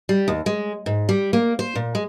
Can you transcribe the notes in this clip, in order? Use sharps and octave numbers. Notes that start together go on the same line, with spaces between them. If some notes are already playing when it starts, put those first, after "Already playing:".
G3
D#2
G#3
G#2
G3
A#3
C5
A#2
G#3